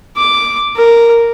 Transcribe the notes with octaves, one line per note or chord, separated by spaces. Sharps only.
D6
A#4